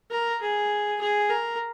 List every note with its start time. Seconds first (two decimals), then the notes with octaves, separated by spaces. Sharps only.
0.11 A#4
0.41 G#4
1.01 G#4
1.30 A#4